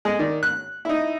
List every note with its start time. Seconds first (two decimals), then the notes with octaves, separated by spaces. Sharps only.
0.05 G#3
0.19 D#3 D5
0.43 F#6
0.85 D#4 E4